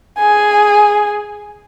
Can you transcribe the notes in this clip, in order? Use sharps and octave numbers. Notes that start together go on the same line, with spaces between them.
G#4 G#5